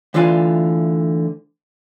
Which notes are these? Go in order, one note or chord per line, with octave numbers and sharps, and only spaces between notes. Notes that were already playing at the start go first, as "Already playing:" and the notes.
D2 D3 E3 F4 D5 G#5